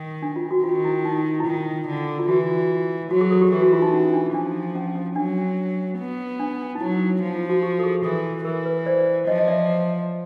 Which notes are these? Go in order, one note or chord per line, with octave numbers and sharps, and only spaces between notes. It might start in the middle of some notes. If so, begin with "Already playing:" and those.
Already playing: D#3
D4
F4
F#4
D#3 F4
E4
D#4
E4
D#3 F4
D3
F4
E3 F#4
F#3 F#4
G#4
A4
G4
E3 G4
F#4
F4
D#4
C#4
D4
F3 D4
C#4
C#4
F#3 D4
B3
D4
D#4
F#3 E4
F3
F4
F#4
G4
A4
G#4
E3 A4
E3 A#4
B4
C5 D5
F3 C#5 D#5
D#5
D5 E5